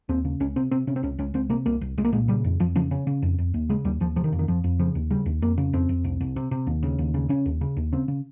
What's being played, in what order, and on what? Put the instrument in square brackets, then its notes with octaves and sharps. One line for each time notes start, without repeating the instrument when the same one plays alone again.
[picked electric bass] D#2 C4
C#3
C#2 C#4
C3 C4
C3 C4
C3 C#4
C4
C#2 C#4
C#2 C#4
C#2 C4
C3 A#3
C2 A#3
C2
C2 G#3
A#3
A#2 G#3
C#3 G3
F2
F2 F3
C#3 F3
C#3 C#4
C#3
F2
F2
D#2
C#3 G#3
D#2 G3
D#2 F3
C3 F3
D#3
F2
D#3
F2 F3
F2
C#3 F3
D#2
C#3 G3
D#2
F2 A#3
C#3
F2 C4
F2
C2
C2
C3
C3
D#2
C#3
D#2
C#3
C#3 C#4
D#2
C#3
D#2
C#3 C4
C#3